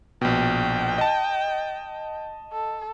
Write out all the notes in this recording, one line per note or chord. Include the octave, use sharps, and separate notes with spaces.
A#1 B2 G5
D#5 A5
A4